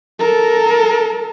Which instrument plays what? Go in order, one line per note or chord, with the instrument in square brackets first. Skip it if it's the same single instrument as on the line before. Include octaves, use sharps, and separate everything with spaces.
[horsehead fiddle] A4 A#4